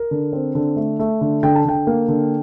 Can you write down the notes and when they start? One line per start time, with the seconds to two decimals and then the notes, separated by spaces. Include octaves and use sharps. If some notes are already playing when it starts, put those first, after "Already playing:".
Already playing: A#4
0.11 D3
0.33 C4
0.55 D3
0.76 A3
0.99 A3
1.21 D3
1.43 D3 G5
1.56 A5
1.65 D3 G5
1.87 A#3
2.08 D3